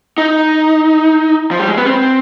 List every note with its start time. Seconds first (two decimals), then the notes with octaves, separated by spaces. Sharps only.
0.18 D#4
1.51 F3
1.59 G3
1.68 G#3
1.77 B3
1.86 C4